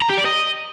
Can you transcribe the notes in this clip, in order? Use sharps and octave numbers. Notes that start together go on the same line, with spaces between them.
A#5
G4
D5
D#5